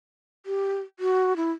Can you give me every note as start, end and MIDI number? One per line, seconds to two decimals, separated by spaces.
0.46 0.80 67
1.00 1.36 66
1.36 1.51 64